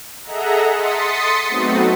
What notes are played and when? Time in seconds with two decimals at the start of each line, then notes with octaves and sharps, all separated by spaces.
0.23 G#4 A4 D#5 E5 F#5 A#5
0.71 C6 D#6 A6 B6 C#7
1.49 F#3 A3 B3 C4 D#4 F#4